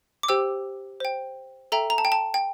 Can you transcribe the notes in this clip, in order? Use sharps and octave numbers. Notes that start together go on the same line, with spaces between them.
D6
G4 C5 G5 E6
C5 G5
A4 E5 G5 A#5
A#5
A5
G5
A5
G5